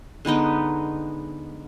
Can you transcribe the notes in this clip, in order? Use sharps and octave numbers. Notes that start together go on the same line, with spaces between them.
D3 G#3 B3 D#4